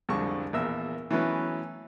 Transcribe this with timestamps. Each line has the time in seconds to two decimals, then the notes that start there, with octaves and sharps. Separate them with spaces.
0.09 C2 F2 D3 G#3 A5 C#6
0.53 A#1 E2 A#4 E5 E6
1.11 E3 F#3 A3 B3 C#4